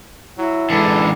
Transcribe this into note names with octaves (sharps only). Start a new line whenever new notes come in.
F#3 E4
D3 E3 G#3 A4